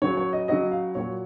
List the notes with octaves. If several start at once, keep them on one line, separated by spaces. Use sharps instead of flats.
C#3 F#3 C#5
C#5
D#5
C#3 F#3 D#5
F5
A#2 F#3 C#5